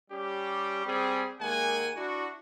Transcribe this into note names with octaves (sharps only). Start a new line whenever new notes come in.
G3 C#4 G4
G3 C4 G#4
D#2 G#3 A#3 F#5 G#5
D4 E4 F#4